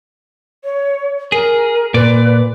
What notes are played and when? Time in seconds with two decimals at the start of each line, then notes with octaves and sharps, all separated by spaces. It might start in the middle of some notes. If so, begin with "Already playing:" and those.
0.64 C#5
1.32 G#4 A#4
1.94 A#2 B4 D5